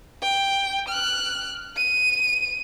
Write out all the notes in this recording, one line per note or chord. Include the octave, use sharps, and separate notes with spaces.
G5
F6 F#6
D#7